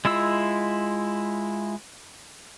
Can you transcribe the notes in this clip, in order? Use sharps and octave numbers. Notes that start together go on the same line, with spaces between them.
G#3 E4 F4 E6